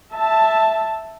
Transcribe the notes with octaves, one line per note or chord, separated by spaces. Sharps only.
E5 A5